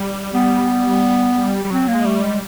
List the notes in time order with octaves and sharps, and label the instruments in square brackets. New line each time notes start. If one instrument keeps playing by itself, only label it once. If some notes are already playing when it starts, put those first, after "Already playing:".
Already playing: [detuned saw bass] G3
[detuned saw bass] G3 [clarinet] B3
[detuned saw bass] G3
[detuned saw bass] F#3 [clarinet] C4
[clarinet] A#3
[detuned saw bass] G#3
[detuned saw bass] G3 [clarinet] A3
[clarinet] G#3